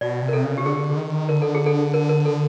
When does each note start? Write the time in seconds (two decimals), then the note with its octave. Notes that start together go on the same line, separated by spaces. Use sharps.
0.01 B2 D5
0.22 C3
0.28 A#4
0.33 A4
0.44 C#3
0.58 G4
0.65 D3 G#4
0.97 D#3
1.29 D3 A#4
1.42 A4
1.55 G#4
1.66 A4
1.94 A#4
2.09 A#4
2.25 A4